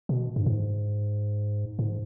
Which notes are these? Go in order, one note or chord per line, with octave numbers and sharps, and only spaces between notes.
B2
G2
G#2
G#2